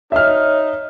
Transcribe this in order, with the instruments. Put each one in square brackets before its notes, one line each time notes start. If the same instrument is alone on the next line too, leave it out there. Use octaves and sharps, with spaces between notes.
[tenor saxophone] D#4 [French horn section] C#5 [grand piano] E5 F6